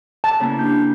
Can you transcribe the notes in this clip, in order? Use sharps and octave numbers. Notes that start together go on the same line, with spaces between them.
A5
C#3 A#3 E4
D4 G4 G6